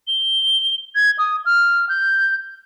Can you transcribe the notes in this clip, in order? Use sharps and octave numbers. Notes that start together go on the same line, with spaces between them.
G7
G#6
D#6
F6
G6